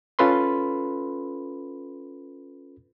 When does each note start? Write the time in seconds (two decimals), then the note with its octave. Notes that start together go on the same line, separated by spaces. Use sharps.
0.19 C#4 F4 A4 B4 B5 C6